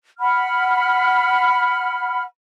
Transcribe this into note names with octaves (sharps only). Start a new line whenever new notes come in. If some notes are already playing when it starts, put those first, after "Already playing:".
F#5 B5 F6